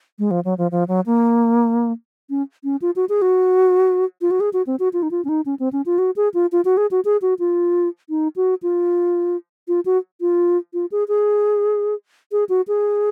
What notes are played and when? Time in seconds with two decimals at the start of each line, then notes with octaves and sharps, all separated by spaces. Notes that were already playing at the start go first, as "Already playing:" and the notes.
0.19 G#3
0.31 F3
0.45 F#3
0.58 F3
0.71 F3
0.88 F#3
1.06 A#3
2.30 C#4
2.64 C#4
2.82 F4
2.96 F#4
3.09 G#4
3.22 F#4
4.21 F4
4.31 F#4
4.40 G#4
4.53 F#4
4.67 C4
4.79 F#4
4.93 F4
5.03 D#4
5.11 F4
5.25 C#4
5.29 D#4
5.46 C#4
5.59 C4
5.73 C#4
5.86 F4
5.98 F#4
6.16 G#4
6.34 F4
6.52 F4
6.65 F#4
6.77 G#4
6.91 F#4
7.05 G#4
7.22 F#4
7.39 F4
8.10 D#4
8.36 F#4
8.63 F4
9.68 F4
9.85 F#4
10.21 F4
10.74 F4
10.92 G#4
11.08 G#4
12.32 G#4
12.49 F#4
12.68 G#4